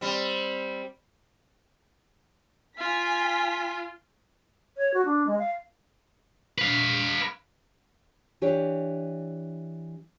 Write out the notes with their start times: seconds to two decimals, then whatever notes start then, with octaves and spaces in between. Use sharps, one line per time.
0.01 G3 C4
2.78 F4 G#5 B6
4.77 C#5
4.94 F#4
5.05 D4
5.27 G#3
5.39 F5
6.58 B4 F5
8.42 E3 D4 G4 C#5